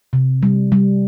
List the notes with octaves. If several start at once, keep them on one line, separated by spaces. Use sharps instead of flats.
C3
G3
G3